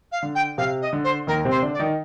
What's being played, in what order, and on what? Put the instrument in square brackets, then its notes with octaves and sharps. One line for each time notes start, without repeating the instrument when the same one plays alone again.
[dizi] F5
[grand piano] D3
[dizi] G5
[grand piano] C3 [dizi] F5
[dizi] D#5
[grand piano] D3
[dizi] C5
[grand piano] D#2 D#3 [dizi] A#4
[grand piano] C3 C4
[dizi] C5
[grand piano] D3 D4
[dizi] D5
[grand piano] D#3 D#4